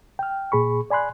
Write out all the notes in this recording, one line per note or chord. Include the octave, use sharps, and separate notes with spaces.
G5 F6
A#2 G#4 B5 C#6
D5 G#5 B5 C6 F#6